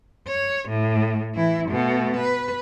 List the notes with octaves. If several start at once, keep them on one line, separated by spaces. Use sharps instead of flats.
C#5
A2
E3 E4
B2 A3
B4